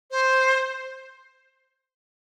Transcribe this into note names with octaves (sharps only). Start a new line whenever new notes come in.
C5